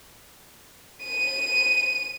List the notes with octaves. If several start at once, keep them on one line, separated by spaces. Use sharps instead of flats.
D#7